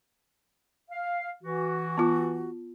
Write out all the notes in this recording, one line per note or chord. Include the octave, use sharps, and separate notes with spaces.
F5
E3 F#4
B3 F4